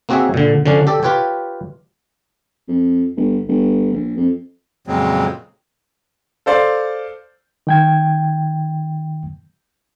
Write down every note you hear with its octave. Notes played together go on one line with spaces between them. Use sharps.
A#3 C4 F#4 G#4 C#5 E5
A#2 D3
D3 F3 C#4 D4
G4 A4 D5
F4 G4 B4 C#5 G5
F2
G1
G1
A#1
F2
F2 A#2 C#3 F#3 G#3 C4
A4 C5 D5 F5 C6
D#3 G5 G#6